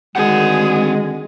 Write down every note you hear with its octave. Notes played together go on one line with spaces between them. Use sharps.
D3 D#3 G#3 C4 F#4 G#4 F#5